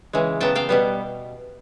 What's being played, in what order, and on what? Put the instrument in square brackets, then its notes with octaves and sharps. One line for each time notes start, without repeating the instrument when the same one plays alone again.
[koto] C#3 E3 G#3
C#3 F#3 B3 G5 A5
F5 G5
B2 G3 B3